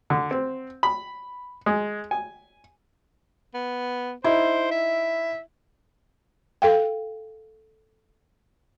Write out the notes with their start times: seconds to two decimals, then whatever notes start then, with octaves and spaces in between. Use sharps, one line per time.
0.10 D3
0.31 C4
0.83 B5
1.66 G#3
2.11 G#5
3.54 B3
4.24 D#4 E4 C5
4.71 E5
6.62 A4 F5 G5